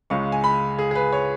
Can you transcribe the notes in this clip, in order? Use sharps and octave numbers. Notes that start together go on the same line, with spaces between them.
C#2 C#3 G#3 C#6
G#5
B5
G#4
G#4
B4
C#5